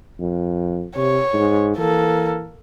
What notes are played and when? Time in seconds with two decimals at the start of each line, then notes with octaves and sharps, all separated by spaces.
0.20 F2
0.96 C3 C#5
1.33 G#2
1.78 E3 A#3 A4